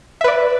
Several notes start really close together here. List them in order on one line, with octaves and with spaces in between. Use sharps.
E5 B4 D5